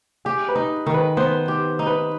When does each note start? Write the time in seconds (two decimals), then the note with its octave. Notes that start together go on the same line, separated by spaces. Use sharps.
0.25 G4 G#4
0.48 B4
0.55 D#4
0.87 D#3
0.94 B4
1.17 B3 C5
1.48 G4
1.79 D#4
1.86 B4